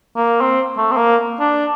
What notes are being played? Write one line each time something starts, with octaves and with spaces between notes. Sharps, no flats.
A#3
C4
A3
C4
A#3
D4